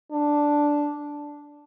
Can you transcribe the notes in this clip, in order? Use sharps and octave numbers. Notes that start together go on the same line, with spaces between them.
D4